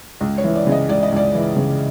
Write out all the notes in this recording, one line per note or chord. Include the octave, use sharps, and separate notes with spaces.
C#2
C#5
E3
D5
C#3
D#5
C#2 D5
D#5
C#2 D5
E3
C#3